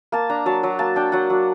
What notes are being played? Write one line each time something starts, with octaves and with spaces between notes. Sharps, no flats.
A#3 A5
D4 A#5
F#3 A5
F#3 A#5
A#3 A5
D4 G5
F#3 F#5
F#3